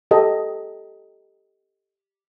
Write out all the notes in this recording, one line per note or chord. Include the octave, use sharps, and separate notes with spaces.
G4 A4 D#5